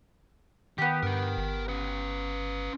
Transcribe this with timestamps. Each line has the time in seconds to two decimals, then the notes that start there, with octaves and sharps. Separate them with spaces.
0.78 D#3 B3 G4
1.03 G2 A#4 G5
1.37 G1
1.68 C#4 B4